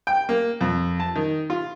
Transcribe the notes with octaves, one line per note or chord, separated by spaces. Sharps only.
G5
A#3
F2
A5
D#3
F4